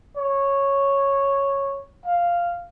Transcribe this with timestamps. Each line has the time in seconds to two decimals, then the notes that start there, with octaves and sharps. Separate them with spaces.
0.17 C#5
2.05 F5